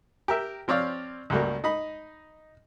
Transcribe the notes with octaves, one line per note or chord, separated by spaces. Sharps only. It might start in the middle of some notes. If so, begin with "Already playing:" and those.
G4 A#4 E5
F3 C4 C#5 D5 F5
C#2 F#3 G3 A3 A#3
D#4 D#5 B5